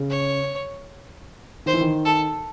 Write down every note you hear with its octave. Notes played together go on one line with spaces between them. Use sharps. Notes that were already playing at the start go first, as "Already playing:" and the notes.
Already playing: C#3
C#5
D#3 C5
E3
D#3
A4